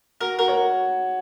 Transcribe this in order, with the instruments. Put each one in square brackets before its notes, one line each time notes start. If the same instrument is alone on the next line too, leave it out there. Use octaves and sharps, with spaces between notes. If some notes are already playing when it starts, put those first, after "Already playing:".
[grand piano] F#4 [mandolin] A#4
[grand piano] F#4 [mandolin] A#4
[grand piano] C#5